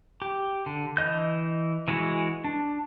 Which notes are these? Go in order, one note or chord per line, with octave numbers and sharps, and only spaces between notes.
G4
D3
E3 D#5 G6
E3 G#3 E4 F#4
D4